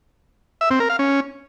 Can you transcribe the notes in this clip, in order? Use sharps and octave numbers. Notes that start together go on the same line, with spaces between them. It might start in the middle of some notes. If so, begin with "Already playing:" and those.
E5
C4
A#4
F5
C#4